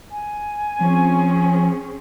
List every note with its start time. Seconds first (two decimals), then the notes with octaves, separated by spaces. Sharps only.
0.11 G#5
0.80 F3 C4 C#4 G#4